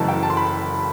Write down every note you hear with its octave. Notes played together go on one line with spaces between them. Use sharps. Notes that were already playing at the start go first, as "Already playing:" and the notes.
Already playing: F#1 F#2 E3 A3 A5
G5
A5
C6
B5